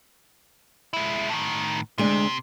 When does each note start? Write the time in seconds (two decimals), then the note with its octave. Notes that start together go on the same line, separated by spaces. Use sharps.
0.93 G#3 E4
1.29 A2 D#3
1.98 D2 C3 G#3 D4